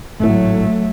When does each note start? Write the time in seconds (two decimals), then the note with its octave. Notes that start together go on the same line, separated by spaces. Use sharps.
0.20 G#1 A2 F#3 A3